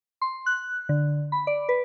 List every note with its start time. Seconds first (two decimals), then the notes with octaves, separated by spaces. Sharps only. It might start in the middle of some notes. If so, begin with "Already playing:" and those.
0.22 C6
0.46 F#6
0.89 D3
1.32 B5
1.47 D5
1.69 B4